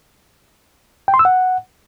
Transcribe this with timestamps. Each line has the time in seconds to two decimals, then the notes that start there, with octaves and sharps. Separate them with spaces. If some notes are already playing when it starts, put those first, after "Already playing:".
1.08 G5
1.14 C6
1.19 E6
1.25 F#5